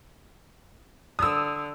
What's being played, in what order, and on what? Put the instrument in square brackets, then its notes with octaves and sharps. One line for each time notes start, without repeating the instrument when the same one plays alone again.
[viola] D3 [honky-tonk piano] D#6 E6